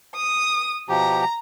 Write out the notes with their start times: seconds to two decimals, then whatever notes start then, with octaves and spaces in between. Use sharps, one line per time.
0.14 D#6
0.89 B2 F3 G4 A#5